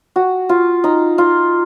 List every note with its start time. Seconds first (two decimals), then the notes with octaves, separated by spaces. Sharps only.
0.16 F#4
0.49 F4
0.84 D#4
1.18 F4